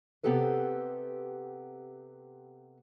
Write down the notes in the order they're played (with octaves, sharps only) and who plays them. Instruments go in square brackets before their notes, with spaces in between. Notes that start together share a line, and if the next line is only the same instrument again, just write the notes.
[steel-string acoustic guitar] C3 B3 C4 G4 A4 B4